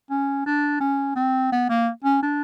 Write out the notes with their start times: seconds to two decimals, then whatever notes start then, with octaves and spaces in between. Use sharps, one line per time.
0.10 C#4
0.46 D4
0.80 C#4
1.16 C4
1.52 B3
1.70 A#3
2.04 C#4
2.22 D4